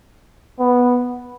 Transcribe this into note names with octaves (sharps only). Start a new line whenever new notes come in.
B3